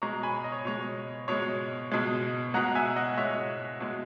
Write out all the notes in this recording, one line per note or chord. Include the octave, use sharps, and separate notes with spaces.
B2 G#3 A#5 C#6
G#5 B5
D#5
C#5
B2 G#3 C#5
B2 G#3 C#5
B2 G#3
B2 G#3 F#5 A#5
E5 G#5
D#5 F#5
B2 G#3 C#5 E5
B2 G#3